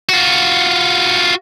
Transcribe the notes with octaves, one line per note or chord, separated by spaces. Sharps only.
F4 F#4